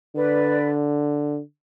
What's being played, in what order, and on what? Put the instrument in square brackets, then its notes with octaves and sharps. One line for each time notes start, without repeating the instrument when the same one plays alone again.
[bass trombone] D3 [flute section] B4 D5